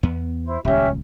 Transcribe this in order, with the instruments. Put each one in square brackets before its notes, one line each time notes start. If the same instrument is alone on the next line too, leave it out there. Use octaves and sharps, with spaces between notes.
[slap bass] E2 B3
[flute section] E4 C5
[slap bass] D#1 C#2 [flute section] C#4 G4 E5